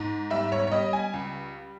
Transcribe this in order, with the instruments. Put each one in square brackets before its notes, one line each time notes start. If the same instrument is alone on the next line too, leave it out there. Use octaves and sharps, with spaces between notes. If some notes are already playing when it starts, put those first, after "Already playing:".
Already playing: [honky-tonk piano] G#2
G3 E5
C#5
C#5
G3 D#5
G#5
C#2